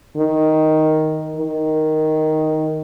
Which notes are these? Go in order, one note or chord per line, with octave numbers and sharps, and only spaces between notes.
D#3
D#3